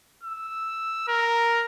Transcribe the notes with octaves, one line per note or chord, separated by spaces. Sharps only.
E6
A#4